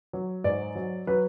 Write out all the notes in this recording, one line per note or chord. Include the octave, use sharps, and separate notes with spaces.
F#3
G#2 D5
F#3
F#3 B4